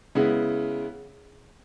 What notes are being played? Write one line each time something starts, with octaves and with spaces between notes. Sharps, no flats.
C#3 G#3 B3 E4